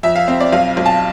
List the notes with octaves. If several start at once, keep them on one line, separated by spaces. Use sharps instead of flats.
F2 E5
F5
C4 F5
D5
B1 F5
B1
A5